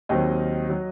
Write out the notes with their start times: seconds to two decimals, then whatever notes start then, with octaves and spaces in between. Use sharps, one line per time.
0.09 D#2 D#3 F#3 C4 D#5
0.70 F#3